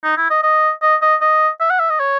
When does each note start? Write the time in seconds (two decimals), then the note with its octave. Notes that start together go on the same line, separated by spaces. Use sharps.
0.04 D#4
0.17 E4
0.30 D#5
0.43 D#5
0.82 D#5
1.02 D#5
1.21 D#5
1.60 E5
1.70 F#5
1.79 E5
1.90 D#5
2.00 C#5